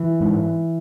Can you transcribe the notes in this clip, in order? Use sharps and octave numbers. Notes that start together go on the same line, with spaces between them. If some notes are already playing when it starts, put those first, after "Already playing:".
Already playing: E3
G#2